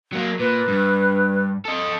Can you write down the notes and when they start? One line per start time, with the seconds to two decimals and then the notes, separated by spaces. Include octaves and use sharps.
0.13 F#3 A#3
0.39 A#2 B4
0.68 G2
1.65 A4 D#5